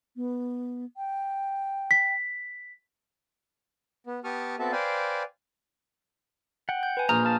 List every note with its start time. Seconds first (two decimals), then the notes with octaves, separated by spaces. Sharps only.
0.16 B3
0.97 G5
1.91 B6
4.07 B3
4.24 B3 G4 A5 C#6 D#6 F6
4.59 B3 C4 F#4 A4 E5 A5
4.72 B4 C5 D5 F5 G5 G#5
6.69 F#5 G5
6.83 G6
6.97 B4 G#5
7.09 A#1 A#5 D#6 F6 G6
7.25 F5 A5 A#5